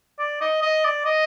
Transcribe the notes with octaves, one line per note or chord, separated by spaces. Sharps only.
D5
D#5
D#5
D5
D#5